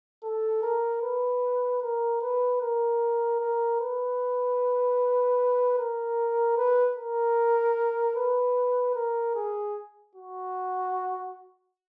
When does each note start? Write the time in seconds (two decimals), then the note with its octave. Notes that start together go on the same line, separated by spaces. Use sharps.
0.23 A4
0.62 A#4
1.02 B4
1.82 A#4
2.22 B4
2.61 A#4
3.40 A#4
3.80 B4
5.78 A#4
6.57 B4
6.97 A#4
8.16 B4
8.95 A#4
9.35 G#4
10.15 F#4